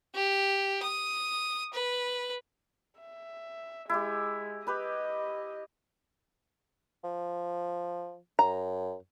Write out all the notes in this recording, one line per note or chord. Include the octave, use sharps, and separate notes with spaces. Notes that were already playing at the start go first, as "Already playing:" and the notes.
G4
D#6
B4
E5
G#3 E4 G4
G4 B4 D#5 B5
F3
F#2 A#5